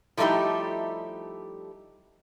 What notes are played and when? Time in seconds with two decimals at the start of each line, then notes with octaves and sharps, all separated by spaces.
0.17 F3 G3 A3 D#4 E4 G4